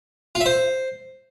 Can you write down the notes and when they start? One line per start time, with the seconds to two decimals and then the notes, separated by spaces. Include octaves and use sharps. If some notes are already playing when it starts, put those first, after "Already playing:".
0.35 F4
0.41 E5
0.46 C5